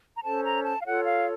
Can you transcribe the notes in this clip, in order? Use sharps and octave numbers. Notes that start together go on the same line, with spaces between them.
A#5
C#4 A4 C5 A5
A#5
A5
F5
F4 A4 C#5 F#5
F5